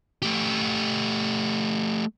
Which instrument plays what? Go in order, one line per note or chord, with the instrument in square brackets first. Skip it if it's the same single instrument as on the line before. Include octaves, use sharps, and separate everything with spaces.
[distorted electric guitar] A3 G4